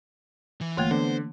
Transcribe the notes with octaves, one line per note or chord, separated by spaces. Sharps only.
E3
G1 E3 A3 A#3 F4 G5
D3 B3 C5